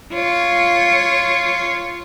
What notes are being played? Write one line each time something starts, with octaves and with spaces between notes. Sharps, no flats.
F4 C#5